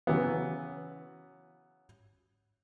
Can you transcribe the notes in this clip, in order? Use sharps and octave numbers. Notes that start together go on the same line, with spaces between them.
C#3 E3 F#3 B3